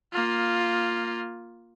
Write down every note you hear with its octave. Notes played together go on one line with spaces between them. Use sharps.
A#3 F4